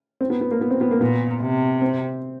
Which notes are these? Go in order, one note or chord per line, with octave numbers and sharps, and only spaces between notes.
C4
B3
B3
A#3
B3
C4
B3
A#3
A#2 B3
C3
C4